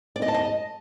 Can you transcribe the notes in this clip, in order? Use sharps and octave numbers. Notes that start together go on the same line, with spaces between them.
D5
D#5
A5
D#5